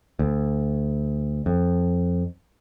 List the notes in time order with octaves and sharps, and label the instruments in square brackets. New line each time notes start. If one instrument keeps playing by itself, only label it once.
[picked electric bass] D2
F2